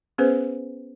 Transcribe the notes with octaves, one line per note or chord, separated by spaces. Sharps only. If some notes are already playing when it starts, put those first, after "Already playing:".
B3 C#4 G#4 B4 C5